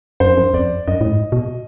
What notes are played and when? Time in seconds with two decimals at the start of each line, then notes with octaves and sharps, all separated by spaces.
0.20 F#2 C5
0.28 F2
0.37 F#2
0.54 F2 D5
0.87 F#2 D#5
1.01 A2
1.10 G#2
1.32 B2